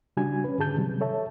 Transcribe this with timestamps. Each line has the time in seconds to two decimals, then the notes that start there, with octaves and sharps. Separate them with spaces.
0.17 C#3 G3 D4 F#4 G#5 G#6
0.44 C#4 B4
0.58 G#2 D3 G#4 A5 G6
0.77 C3 D#3 F#3 G3
1.01 A4 C#5 E5 A5